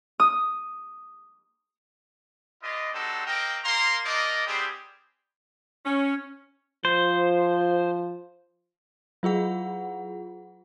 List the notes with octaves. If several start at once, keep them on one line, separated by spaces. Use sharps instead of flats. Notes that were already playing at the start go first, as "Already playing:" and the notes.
D#6
F4 G#4 B4 D5 D#5
G3 G#3 C4 D#4 F#4 A4
A#3 C4 A#4 D#5 G5
A#3 A#5 C6
A#3 D4 D#4 D5 D#5
G3 B3 C4 G4 G#4
C#4
F3 C5
F#3 F4 G#4 F#5